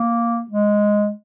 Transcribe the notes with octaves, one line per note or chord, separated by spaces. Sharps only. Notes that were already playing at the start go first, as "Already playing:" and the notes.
Already playing: A#3
G#3